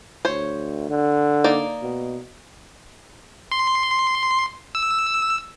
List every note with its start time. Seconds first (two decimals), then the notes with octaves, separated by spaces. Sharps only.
0.25 D2 C5 C#5
0.90 D3
1.44 A#3 D#4 D5
1.82 B2
3.52 C6
4.75 E6